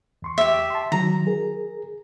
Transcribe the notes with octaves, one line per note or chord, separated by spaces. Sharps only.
E2 C6 C#6
G4 E5
A5 C6
D#3 F#3 A#5
G#4 A#4